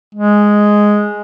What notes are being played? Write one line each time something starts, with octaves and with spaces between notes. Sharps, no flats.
G#3